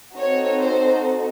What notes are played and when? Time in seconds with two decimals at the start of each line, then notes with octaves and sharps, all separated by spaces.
0.16 C4 D#4 F#4 A4 C#5
0.61 C5